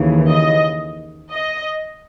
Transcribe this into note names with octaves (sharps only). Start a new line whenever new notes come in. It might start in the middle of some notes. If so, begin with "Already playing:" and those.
Already playing: D#2 C#3 E3
D#5
D#5